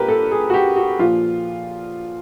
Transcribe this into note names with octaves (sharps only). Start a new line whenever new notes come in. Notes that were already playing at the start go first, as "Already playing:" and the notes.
Already playing: A#2 G4 A#4 B4
A4
G#4
F#4
G4
F#4
A#2 F3 F4